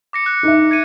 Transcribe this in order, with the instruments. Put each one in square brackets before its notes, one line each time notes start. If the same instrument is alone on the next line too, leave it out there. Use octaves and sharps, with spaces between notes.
[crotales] D6 A#6 C#7
F#6
[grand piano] D#4 E5
[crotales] G#6 C#7 D#7